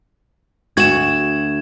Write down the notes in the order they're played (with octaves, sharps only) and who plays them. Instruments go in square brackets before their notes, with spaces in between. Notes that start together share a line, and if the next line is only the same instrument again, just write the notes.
[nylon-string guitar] D2 F#4 [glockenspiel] G#6 E7